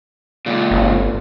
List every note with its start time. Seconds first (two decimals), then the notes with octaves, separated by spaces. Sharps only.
0.46 C#2 A#2
0.70 G1